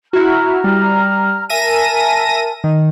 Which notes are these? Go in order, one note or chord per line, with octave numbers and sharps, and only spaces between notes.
E4 F#4 A#5 F6
G3
A#4 E5 G#5 A5 A#6 D#7
D#3